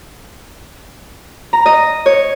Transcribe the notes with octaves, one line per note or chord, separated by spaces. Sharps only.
A#5
D#5
C#5